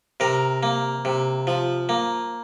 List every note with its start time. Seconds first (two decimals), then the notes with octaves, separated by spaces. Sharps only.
0.20 C3 A#4
0.63 A#3
1.05 C3
1.47 F3
1.89 A#3